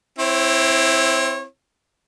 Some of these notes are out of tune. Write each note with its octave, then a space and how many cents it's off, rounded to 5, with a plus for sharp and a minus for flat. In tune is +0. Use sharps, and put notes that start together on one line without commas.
C4 +0 E4 +0 C#5 -35